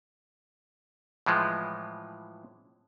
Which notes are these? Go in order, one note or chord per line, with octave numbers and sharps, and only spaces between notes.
A2 E3 F3 G#3